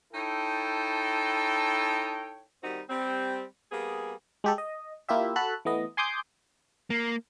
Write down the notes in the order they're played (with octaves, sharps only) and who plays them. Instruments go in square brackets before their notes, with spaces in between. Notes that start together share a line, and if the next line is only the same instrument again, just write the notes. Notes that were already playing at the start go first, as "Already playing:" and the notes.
[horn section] D#4 E4 A4 C#5 G5 A5
[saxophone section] D#3 G3 C4 D#4 F#4
G3 C4
G3 A#3 B3 G#4
[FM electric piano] G#3 G4 A4
D#5
A#3 E4 F4 G4 E5
F#4 A4 A5 B5 F#6
E3 A3 B3 D#5
G#5 C6 D6 D#6 G6
[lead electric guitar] A#3